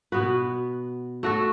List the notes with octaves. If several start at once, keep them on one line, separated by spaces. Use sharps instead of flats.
B2 B3 F#4 B4
A3 F#4 A4